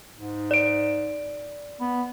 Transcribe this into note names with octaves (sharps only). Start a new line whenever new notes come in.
G#2
D5 D7
B3